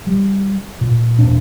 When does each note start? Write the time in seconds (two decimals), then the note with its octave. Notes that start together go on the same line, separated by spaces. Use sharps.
0.07 G3
0.81 A#2
1.19 E1 A#2 D4